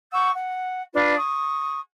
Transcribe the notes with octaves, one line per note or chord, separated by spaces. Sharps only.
F#5 C#6 E6 G6
F#5
D4 F4 B4
C#6 D#6